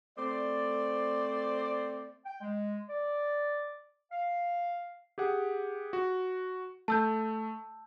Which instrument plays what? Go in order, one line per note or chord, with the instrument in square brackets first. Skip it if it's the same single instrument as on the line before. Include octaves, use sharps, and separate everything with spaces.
[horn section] A3 C4 C5 D5
[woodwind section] G5
G#3
D5
F5
[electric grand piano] G4 G#4 F#5
F#4
[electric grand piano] A3 [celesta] A5 E6 G6